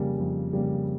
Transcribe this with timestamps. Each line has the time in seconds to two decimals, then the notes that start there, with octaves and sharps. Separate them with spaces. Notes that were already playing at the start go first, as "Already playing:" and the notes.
Already playing: F2 C#3 G3 A#3
0.18 F2
0.53 C#3 G3 A#3